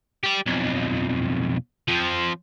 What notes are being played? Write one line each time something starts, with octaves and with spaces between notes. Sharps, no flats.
G4 D5
B1 F2
F3 C4